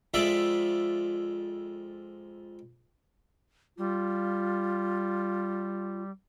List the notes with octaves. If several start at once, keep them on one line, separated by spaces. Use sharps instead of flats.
F2 G#3 F4 D5 E5
G3 F4